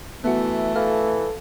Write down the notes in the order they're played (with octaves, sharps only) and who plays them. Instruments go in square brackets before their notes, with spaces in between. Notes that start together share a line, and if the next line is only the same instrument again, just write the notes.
[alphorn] E3 [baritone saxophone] A3 [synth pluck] B3 F#4
[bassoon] E3 [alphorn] A4 [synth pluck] F5